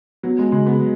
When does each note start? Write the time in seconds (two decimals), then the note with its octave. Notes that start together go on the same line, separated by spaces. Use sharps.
0.23 F#3 B3
0.38 G#3
0.52 C#3 G#3
0.66 B3
0.80 F#3